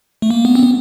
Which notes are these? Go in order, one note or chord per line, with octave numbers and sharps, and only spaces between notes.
A3
A#3
B3
C4
B3